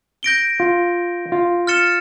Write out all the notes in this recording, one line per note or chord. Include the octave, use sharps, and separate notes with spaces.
G6 A#6 D7 G7
F4
F4
F6 A6 C#7 E7 G7